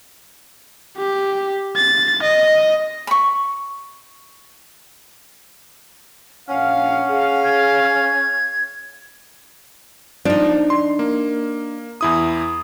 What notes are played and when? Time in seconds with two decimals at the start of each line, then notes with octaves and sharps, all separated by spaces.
0.97 G4
1.76 A6
2.23 D#5
3.07 B5 C#6
6.49 A#1 C#4 F5 F#5
7.08 G#4 F5
7.44 G#6
10.25 F3 D4 D#4
10.70 C6
10.99 A#3
12.01 E2 E4 D#6